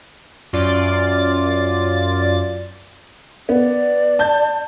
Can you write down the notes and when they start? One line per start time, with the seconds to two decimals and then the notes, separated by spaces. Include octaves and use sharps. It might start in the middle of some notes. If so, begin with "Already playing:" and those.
0.53 F#2 F4 D5 A6
3.49 B3 D5
4.19 A5 G6